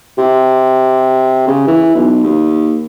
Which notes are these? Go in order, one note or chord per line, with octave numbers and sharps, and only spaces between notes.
C3
C#3
E3
B1
D#2